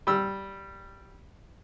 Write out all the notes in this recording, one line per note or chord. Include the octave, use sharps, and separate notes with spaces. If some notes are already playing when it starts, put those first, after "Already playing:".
G3 E6